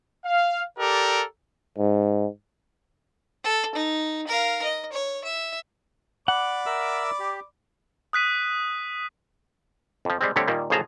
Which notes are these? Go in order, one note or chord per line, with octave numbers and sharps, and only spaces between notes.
F5
G4 A4 A#4 D5
G#2
A4
D#4
A#4 F5
D#5
C#5
E5
D5 F#5 B5 D6
A#4 E5 E6
G4
D#6 F#6 B6 D#7
F2 F3
G3 G#3 C4
D3 G3 A3 C4 G4 C#5
A#2 D#3 G3 A#3
A1 C#3 F3 G#4 A5 A#5